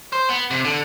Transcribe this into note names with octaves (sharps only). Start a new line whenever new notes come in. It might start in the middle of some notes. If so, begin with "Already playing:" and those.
C5
B3
C3
D3